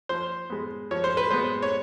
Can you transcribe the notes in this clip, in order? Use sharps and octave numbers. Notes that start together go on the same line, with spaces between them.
F3 C5
G#3 B3
F3 C#5
C5
B4
G#3 B3 C5
C#5